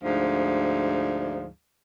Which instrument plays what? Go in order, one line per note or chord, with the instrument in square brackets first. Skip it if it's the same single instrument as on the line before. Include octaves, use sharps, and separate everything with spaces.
[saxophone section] D2 G#2 F3